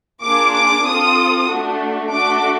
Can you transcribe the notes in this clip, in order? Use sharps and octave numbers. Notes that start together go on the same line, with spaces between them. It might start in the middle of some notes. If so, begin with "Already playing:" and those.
A#3 D4 F4 G#4 D6
D6
C4 F4 A4 D#6
A3 D4 F#4
A3 D4 F#4 A4 D6